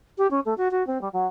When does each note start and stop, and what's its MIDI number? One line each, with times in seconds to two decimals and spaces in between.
0.18 0.27 67
0.31 0.40 61
0.45 0.54 57
0.57 0.68 66
0.71 0.85 66
0.87 1.01 60
1.01 1.08 55
1.13 1.27 54